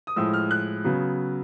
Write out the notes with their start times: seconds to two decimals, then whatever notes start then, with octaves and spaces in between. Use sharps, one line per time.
0.07 D#6
0.16 A2 F3 G#3 E6
0.34 F6
0.51 F#6
0.84 C#3 F#3 B3